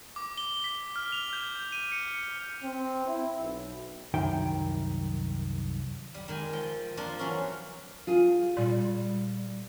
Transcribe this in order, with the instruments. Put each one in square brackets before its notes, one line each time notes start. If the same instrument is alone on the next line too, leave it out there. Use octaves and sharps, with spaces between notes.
[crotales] D6
G7
B6
F6
F7
G6
D#7
C#7
[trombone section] C4
E4
B1
[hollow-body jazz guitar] C2 F#2 D#3 G5
[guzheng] G3
D#3 G#3 G#5
F3 G5
F3 A#3 D4 F4
E3 F#3 C#4
[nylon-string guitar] F4 G#4
[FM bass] A#2 [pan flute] G3